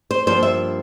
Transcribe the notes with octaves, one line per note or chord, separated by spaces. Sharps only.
C5
G2 F3 A#3 C5
E5